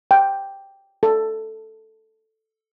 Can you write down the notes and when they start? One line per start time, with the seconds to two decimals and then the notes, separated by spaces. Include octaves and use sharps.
0.11 G5
1.03 A4